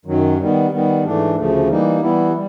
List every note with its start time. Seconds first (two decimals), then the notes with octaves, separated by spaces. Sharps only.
0.05 F#2 D#3 F#3
0.38 D#3 G3 B3
0.70 D#3 G3 B3
1.03 G#2 E3 A3 D4
1.35 D2 C#3 F3 A3
1.67 E3 G3 A#3 D#4
2.00 E3 G3 B3 E4
2.33 G3